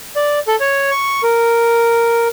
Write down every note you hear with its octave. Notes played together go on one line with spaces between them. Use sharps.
D5
A4
C#5
C#6
A#4